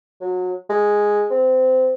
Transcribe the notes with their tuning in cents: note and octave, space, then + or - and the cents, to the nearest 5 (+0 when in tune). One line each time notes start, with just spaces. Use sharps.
F#3 -25
G#3 +0
C4 -20